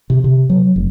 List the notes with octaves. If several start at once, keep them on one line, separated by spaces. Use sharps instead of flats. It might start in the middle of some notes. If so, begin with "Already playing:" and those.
C3
C3
F#3
F1